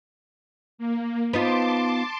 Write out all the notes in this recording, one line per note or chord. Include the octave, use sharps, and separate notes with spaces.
A#3
B3 D#4 F4 A5 C6 D6